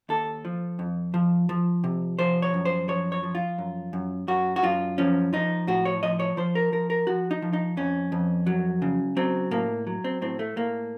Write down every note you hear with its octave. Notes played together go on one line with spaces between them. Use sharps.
D#2 A4
F3
F2
F3
F3
C3
F3 C5
C#5
F#2
C5
F3 C#5
C#5
F3
F4
F#2
F#2
F#2 F#4
F#4
F#2 F4
F3 C#4
F3 D#4
A2 F#4
C#5
F3 D#5
C#5
F3 C5
A#4
F3 A#4
A#4
F3 F#4
D#4
F3
D#4
F2 C#4
F2
F#3
C#3
F#3 C4
A2 A#3
F#3
C4
A2 C4
A3
A2 A#3